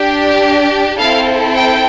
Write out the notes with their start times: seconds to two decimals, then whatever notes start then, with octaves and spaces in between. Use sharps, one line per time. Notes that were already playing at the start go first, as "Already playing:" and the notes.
Already playing: D4 G4
0.97 C4 E4 A4 F5
1.55 G5